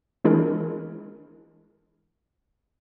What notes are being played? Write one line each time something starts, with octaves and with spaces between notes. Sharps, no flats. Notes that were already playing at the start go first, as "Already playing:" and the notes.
E3 G#3 D4 E4 G#4 A#4